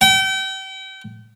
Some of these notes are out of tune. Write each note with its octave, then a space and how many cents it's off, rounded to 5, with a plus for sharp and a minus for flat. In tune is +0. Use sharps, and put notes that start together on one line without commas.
G5 -35